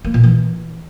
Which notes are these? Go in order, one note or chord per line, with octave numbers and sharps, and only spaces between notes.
A#3
A#2
E3